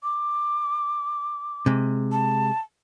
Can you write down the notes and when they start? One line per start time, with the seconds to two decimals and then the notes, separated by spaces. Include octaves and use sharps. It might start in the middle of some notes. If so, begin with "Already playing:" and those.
0.03 D6
1.66 C3 G#3
2.12 A5